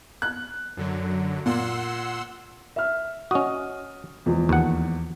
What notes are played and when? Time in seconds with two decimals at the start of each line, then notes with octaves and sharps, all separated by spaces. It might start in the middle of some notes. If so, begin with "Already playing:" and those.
0.22 F#6
0.77 F#2 D3 F#3
1.46 A#2 F#5 C6 E6
2.76 E5 F6
3.31 C#4 F#4 D#5 D#6
4.26 E2 F3 G#3
4.49 D#2 F#5